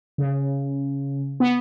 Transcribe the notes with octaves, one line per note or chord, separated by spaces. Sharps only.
C#3
B3